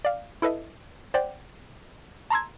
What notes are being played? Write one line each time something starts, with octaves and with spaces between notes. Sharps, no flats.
D5 F5
E4 A4 B4 D#5 E5
C5 D5 F#5 G5
A5 A#5 C6 E6 G#6